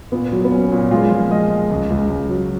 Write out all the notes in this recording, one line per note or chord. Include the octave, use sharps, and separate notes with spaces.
A#2 B3
F#3
B3
F#3 C#4
A#2
G#3 F4
F3
G#3 D#5
G#3
C#2
C#2
C#2
F#3